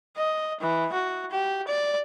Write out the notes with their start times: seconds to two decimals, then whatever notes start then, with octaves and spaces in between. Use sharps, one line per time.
0.17 D#5
0.60 E3
0.93 F#4
1.31 G4
1.68 D5